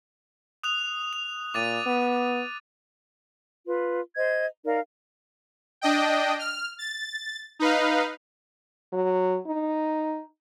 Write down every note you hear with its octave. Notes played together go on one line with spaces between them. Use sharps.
D#6 F#6 F7
F7
A#2 D6 A6 D#7
B3
F4 B4
C5 D#5 G#6
D#4 A#4 D5 F5
D4 D#5 G5
F6
A6
D#4 B4 F5
F#3
D#4